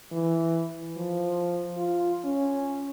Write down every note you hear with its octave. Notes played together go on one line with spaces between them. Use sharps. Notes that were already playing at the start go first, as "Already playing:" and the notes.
E3
F3
F4
C#4